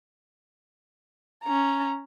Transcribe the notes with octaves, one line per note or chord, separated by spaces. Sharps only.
C#4 A#5